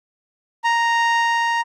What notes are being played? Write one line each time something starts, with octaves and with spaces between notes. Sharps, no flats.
A#5